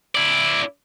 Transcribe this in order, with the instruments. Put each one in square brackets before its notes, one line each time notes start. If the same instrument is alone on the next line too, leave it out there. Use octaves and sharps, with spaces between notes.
[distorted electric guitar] E4 D5